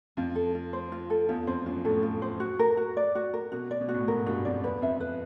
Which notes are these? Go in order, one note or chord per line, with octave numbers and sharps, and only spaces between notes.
F2 F4
A4
F4
C5
F4
A4
E2 F4
F2 C5
F#2 F4
A2 A4
F4
C5
F#4
A#4
F#4
D5
F#4
A#4
B2 F#4
D5
B2
F#4
A2
G#2 A#4
G2 F#4
F2 D5
E2 B4
F2 E5
B4